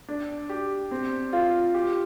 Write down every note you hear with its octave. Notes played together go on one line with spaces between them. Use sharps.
D4
G4
C4
F4
G4